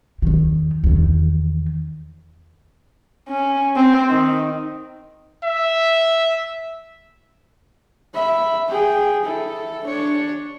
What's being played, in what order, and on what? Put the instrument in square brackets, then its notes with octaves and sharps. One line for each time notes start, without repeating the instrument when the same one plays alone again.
[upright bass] E2 D#3
E2 D#3
[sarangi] C#4
C4
D#3
[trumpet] E5
[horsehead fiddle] E5 B5
G#4 G5
E4 A4
D4 C#5